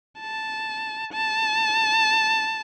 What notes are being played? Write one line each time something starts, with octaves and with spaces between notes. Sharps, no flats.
A5
A5